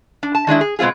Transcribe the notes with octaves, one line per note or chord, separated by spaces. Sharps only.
D4
A5
D#3 G#3 D4 E4
G#4
B2 G#3 C4 F4 G#4